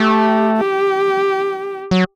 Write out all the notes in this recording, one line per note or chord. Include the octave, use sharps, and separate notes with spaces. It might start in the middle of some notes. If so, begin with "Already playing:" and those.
Already playing: A3 G4
G4
F#3